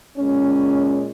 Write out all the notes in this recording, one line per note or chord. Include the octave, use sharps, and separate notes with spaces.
A#2 G#3 C#4